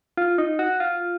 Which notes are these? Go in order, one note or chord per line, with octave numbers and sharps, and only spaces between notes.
F4
D#4
F#4
F4